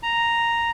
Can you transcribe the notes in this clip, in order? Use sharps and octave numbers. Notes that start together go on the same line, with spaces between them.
A#5